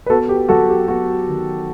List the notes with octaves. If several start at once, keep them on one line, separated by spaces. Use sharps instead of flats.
B4
B3 F#4 A4
G4
F#3 F#4 A4
G4
B3 F#4
D#3